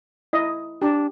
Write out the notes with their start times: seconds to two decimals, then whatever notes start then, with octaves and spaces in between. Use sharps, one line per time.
0.33 E4 D#5
0.82 D4 G4